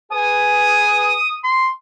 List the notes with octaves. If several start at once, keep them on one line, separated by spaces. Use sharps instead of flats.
G#4 B4 G#5 D#6
C6